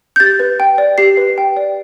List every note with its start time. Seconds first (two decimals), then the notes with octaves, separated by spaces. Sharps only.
0.16 G6
0.20 G4 A6
0.39 B4
0.60 G5
0.78 D5
0.98 G4 C7
1.17 B4
1.38 G5
1.57 D5